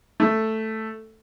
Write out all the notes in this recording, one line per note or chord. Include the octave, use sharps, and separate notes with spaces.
A3